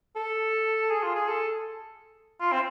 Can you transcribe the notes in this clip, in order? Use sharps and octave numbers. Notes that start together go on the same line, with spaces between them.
A4
G#4
F4
G#4
A4
F4
C4